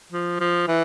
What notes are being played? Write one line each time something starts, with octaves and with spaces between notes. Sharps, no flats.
F3
F3
E3